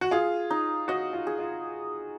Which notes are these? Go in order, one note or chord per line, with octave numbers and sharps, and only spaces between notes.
F#4
F4 G#4
D#4
F#4 D#5
F4
G#4
F4